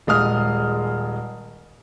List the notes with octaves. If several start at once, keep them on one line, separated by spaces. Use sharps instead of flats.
D#1 G#3 D#6 F6